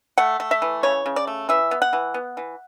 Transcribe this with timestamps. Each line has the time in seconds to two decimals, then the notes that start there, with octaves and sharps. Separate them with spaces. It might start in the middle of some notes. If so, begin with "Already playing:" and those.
0.18 A3 F#5
0.40 A3
0.51 E5
0.62 E3
0.83 C#3 C#5
1.06 C#3
1.16 D5
1.27 A3
1.49 E3 E5
1.71 B3
1.82 F#5
1.93 E3
2.14 B3
2.37 E3